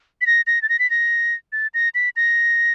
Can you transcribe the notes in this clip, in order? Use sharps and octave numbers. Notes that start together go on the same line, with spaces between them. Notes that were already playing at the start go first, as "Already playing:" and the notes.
B6
A#6
A#6
A6
A#6
B6
A#6
A6
A#6
B6
A#6